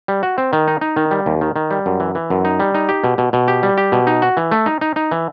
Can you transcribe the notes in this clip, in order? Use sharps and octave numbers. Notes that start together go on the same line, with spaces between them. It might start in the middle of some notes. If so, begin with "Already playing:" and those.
G3
F#4
C4
D#3
D#4
D#4
D#3
G3
D#2
D#3
D#3
G3
F#2
E3
E3
F#2
D#4
G3
D#4
G4
B2
B2
B2
G4
G3
G4
B2
D#4
F#4
E3
A3
D#4
D#4
D#4
E3